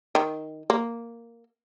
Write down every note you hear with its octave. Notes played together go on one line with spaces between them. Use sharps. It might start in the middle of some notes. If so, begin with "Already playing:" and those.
D#3
A#3